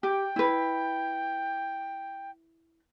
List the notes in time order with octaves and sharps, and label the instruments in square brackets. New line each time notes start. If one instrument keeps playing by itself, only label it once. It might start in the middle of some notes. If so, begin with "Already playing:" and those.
[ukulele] G4 [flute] G5
[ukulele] E4 B4